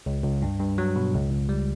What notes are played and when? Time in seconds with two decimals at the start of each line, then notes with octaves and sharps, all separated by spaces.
0.06 C#2
0.24 C#2
0.42 G2
0.60 G2
0.78 F#3
0.96 B2
1.14 C#2
1.31 C#2
1.49 G3